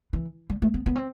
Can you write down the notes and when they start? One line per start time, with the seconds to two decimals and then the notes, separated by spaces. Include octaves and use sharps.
0.13 E3
0.50 G3
0.62 A3
0.74 B3
0.86 B3
0.96 C4